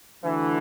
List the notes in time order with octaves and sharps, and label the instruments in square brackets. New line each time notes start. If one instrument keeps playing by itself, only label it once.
[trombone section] D2 D3 E3